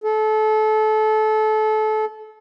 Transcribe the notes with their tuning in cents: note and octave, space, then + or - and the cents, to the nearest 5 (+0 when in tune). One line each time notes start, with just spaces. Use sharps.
A4 -25